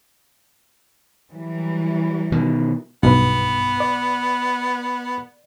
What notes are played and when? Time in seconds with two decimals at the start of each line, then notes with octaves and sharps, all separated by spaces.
1.31 E3 F#3 G3
2.32 B2 D#3
3.03 B1 G2 B3 B4
3.80 D5